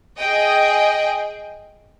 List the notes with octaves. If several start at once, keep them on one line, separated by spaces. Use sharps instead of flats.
G#4 D#5 G5